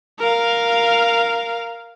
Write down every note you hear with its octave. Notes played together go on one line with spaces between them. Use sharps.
A#4 F5